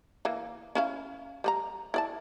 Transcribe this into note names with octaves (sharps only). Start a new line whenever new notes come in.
E3 A#3
C#4 E4 F5
G3 B4 A#5
E4 D5 A5